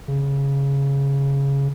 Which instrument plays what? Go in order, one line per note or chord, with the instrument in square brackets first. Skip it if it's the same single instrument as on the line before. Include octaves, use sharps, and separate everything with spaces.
[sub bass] C#3